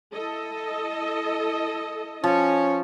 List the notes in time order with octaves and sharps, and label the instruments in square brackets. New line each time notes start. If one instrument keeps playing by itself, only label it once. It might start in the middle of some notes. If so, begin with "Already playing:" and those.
[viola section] E4 A4 D#5
[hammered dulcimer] F3 [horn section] C#4